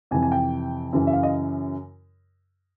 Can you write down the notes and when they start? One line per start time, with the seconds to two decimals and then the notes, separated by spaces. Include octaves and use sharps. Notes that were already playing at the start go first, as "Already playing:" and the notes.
0.11 F2 C3 E3 G#5
0.22 G#5
0.32 G5
0.93 F#2 C#3 E3
1.07 E5
1.13 F5
1.23 D#5